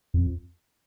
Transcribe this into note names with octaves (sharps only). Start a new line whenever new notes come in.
F2